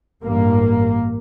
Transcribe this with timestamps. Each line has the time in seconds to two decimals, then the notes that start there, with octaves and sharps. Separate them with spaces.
0.23 A1 G2 A#3